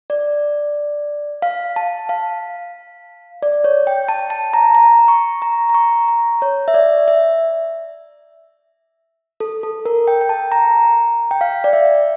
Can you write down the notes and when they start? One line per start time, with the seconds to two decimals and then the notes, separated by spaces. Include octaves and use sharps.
0.10 D5
1.42 F5
1.76 A5
2.09 F5
3.43 D5
3.64 C#5
3.87 G5
4.09 A5
4.30 A5
4.54 A#5
4.75 A#5
5.08 C#6
5.42 A#5
5.69 A#5
5.74 C#6
6.08 A#5
6.42 C#5
6.68 E5
6.74 D5
7.08 E5
9.40 A4
9.63 A4
9.85 A#4
10.08 G5
10.21 G5
10.29 A5
10.52 A#5
11.31 G5
11.41 F5
11.64 D5
11.73 E5